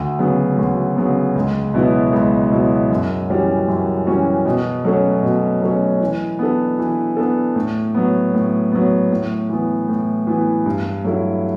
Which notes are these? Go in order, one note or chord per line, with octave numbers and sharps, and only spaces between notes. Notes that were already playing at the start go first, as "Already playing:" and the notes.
Already playing: D2
C#3 F#3 B3
D2
C#3 F#3 B3
C#2
B2 F#3 B3 E4
C#2
B2 F#3 B3 E4
F#2
E3 G3 C#4 F#4
F#2
E3 G3 C#4 F#4
B2
F#3 A3 C#4
B2
F#3 A3 C#4
E3
B3 D4 A4
E3
B3 D4 A4
A2
F#3 B3
A2
F#3 B3
A2
E3 B3
A2
E3 B3
G2
F#3 A3 E4